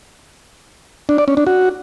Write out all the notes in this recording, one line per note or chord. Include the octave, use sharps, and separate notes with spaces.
D4
D5
C#4
D4
F#4